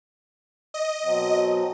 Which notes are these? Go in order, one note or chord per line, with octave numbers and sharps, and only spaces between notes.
D#5
B2 F#3 C4